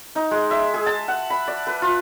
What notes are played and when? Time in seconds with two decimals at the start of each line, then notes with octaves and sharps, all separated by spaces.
0.15 D#4
0.31 G#3
0.51 E5
0.74 G#4
0.86 A5
1.08 F#5
1.30 B5
1.48 D5
1.67 B4
1.82 F4